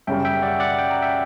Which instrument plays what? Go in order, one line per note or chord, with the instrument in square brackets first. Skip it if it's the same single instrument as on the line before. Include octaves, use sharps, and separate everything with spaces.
[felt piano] F#2 C#3 G3 [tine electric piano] E5 G5
[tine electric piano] E5 G5
D5 F#5
D5 F#5
G5
A#5
E5 G5